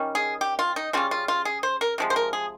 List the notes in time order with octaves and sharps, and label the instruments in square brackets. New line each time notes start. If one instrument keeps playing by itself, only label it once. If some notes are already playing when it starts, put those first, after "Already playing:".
Already playing: [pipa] D#3 G3 C#4
G#4
G4
F4
D#4
C#3 G3 C#4 F4
F4
F4
G#4
C5
A#4
C3 F3 G#3
C5
A#4
G#4